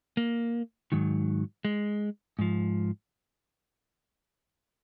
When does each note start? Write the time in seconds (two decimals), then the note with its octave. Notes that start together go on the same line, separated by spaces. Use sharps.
0.17 A#3
0.92 G#2 D#3 F#3
1.65 G#3
2.39 G#2 F3